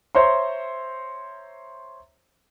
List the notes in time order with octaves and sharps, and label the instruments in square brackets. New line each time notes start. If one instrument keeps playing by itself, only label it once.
[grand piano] C5 C#5 E5 A#5 C6